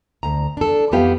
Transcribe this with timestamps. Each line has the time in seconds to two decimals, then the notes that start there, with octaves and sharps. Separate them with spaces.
0.23 D2 A#5
0.57 D4 A4
0.92 F2 E3 B3 G4 F5